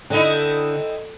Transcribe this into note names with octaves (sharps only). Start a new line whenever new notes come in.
D3 C4 D#4 E4